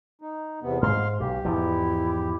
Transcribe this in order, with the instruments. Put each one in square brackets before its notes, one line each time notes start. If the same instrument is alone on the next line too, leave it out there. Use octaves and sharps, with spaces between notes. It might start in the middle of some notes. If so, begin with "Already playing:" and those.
[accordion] D#4
E2 C3 B3
[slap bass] G#2 [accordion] F5 C6 F6
[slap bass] B1 [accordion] G4
[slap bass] E2 G#2 F3 [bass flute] E4